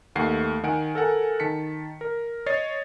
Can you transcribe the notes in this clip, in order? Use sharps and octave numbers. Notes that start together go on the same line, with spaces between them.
D#2 A3 F#5 C7 C#7
D#3 F#5 G#5 D7
A4 A#4 F#5 G#5
D#3 A5 B6 C#7
A#4
C#5 D#5 A6 C7